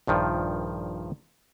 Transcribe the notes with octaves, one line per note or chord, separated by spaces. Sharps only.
A#1 G2 D#3 F3